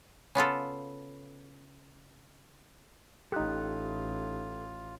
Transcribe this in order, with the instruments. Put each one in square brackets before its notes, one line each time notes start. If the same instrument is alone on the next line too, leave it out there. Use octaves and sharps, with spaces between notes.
[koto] C#3 B3 F4 A4
[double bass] A1 A2 [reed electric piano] D#4 G4 [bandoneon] F4 [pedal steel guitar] A4 F#6